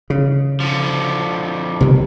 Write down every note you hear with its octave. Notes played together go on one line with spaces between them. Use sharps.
C#3
D3 F3
C2 C3 D#3